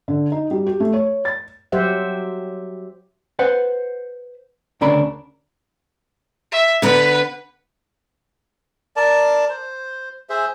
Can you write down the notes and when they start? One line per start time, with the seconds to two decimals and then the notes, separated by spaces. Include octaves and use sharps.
0.08 D3
0.32 D#4
0.51 G3
0.66 G4
0.80 A3
0.94 C#5
1.25 A6
1.72 F#3 G4 C5 E5 F#5
3.39 B4 C5 F#5
4.81 D2 C#3 D4 A#4 B5
6.52 E5
6.82 D3 B3 B4 F#5
8.96 A#4 D5 A5
9.50 C5
10.29 G#4 C5 E5